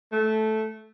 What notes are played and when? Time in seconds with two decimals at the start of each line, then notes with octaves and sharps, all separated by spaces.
0.13 A3